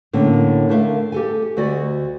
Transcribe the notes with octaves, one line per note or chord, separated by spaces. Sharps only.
A2 D3 A#3 C#4
D3 A3 A#4 E5 F5
G4 A4 G#5
D2 F#4 D5 D#5